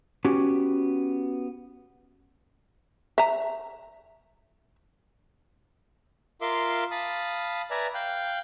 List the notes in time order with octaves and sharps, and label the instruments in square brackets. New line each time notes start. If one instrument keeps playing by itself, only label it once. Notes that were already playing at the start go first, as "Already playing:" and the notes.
[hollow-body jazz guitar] B3 C#4 F#4 G4
[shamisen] E5 A#5
[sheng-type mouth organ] F4 A#4 E5 F5 C6 D6
F5 A5 B5 D#6
B4 D5 E5 G#5 A#5
F5 G5 F#6